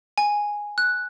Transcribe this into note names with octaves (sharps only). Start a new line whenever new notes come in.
G#5
F#6